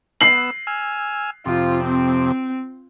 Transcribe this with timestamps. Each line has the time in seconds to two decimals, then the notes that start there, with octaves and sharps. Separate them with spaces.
0.21 B3 E6 C7 F#7
0.67 G#5 E6 F6
1.46 F2 C3 F4
1.84 C4